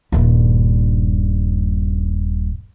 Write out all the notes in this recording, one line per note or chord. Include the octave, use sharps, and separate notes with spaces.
D#1 G2